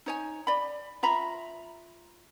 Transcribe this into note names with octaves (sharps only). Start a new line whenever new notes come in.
D#4 C#5 G#5
D5 B5
F4 E5 A#5 B5